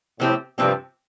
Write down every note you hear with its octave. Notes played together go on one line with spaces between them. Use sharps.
A2 C3 F3 C4 G4
G2 C3 F3 C4 G4